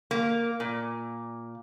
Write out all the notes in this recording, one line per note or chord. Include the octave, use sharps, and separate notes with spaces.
A#3
A#2